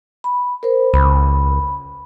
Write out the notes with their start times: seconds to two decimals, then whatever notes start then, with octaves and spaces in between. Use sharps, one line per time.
0.24 B5
0.63 A#4 C5
0.94 C#2 B5